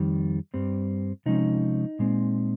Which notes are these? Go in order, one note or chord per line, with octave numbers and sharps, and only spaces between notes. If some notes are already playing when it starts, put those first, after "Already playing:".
Already playing: F2 D#3 G3
G2 G3 C4
C3 F3 G#3 C#4 D#4
A#2 G#3 C4